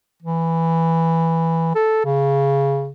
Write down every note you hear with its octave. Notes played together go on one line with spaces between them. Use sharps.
E3
A4
C#3